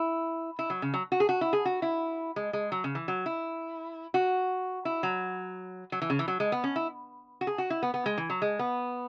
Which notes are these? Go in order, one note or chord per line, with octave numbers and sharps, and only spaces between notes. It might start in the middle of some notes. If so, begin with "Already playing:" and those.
Already playing: E4
E4
F#3
C#3
F#3
F#4
G#4
F#4
E4
G#4
F#4
E4
G#3
G#3
F#3
C#3
E3
F#3
E4
F#4
E4
F#3
F#3
E3
C#3
E3
F#3
G#3
B3
C#4
E4
F#4
G#4
F#4
E4
B3
B3
G#3
E3
F#3
G#3
B3